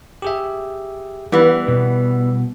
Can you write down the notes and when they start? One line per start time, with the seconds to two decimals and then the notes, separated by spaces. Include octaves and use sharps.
0.22 G4 G#4 E5
1.32 E3 G3 B3
1.68 B2